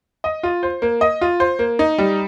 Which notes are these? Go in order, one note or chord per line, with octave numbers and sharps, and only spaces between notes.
D#5
F4
C5
A#3
D#5
F4
C5
A#3
D#4
G3